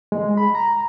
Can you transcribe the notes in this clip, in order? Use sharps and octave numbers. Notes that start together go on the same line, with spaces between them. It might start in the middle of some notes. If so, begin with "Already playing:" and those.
G#3
B5
A#5